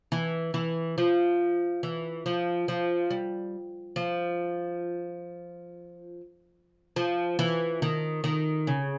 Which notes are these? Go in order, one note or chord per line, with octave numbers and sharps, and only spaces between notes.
E3
E3
F3
E3
F3
F3
G3
F3
F3
E3
D#3
D#3
C#3